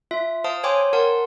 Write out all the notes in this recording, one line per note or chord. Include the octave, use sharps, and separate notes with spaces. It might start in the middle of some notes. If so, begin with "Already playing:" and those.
F4 E5
C5 F5 A5 D#6
C5 C#5 G5 G#5 C6 D6
A#4 F#5 A5 C6